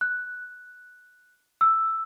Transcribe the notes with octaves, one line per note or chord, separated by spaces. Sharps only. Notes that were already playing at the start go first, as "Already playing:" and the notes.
F#6
E6